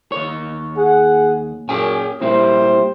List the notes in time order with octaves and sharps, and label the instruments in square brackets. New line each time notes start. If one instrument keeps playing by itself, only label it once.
[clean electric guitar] D#2 C#5
[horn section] G#4 F#5
[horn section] F#2 A#2 C#4 [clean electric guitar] G#4 G5 G#5
[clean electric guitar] C2 A#2 C4 [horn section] E4 G4 C5